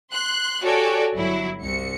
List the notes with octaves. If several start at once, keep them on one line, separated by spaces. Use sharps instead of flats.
C6 F#6
F#4 G4 A4 C#5 D5 G#5
G1 F#3 E4
C2 C#7